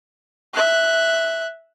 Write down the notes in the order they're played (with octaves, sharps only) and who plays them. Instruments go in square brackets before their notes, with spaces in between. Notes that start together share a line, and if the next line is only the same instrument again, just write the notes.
[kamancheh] E5 F#6